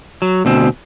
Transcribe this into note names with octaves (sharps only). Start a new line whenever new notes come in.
F#3
D2 B2 C4